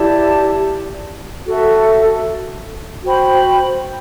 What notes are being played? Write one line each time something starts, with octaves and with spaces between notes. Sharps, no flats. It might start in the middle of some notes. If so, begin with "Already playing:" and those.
Already playing: E4 G4 D5 A5
F#4 A4 E5
F#4 C5 G5 B5